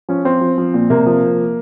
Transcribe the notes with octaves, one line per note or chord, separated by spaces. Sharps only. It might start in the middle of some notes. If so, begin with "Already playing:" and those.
F3 C#4
F3 C4
F3
F3
A#2
C3 A#3
F3